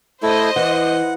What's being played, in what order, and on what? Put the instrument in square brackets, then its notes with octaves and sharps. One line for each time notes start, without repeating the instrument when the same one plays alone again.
[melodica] A3 E4 [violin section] C5 D#5
[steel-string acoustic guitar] E3 [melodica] F#5